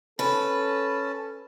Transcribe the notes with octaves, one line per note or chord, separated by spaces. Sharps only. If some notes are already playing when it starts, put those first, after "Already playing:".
C#4 A4 B4 A5